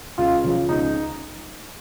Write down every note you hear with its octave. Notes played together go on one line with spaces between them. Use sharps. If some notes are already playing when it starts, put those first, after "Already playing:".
C#2 F4
C#3 F3
C#2 D#4